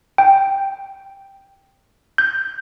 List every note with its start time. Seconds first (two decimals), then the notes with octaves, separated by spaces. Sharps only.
0.18 G5
2.18 G6